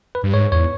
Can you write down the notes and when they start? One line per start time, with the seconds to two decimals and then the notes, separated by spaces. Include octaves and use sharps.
0.15 B4
0.23 G2
0.33 G#2 C#5
0.52 E2 C#5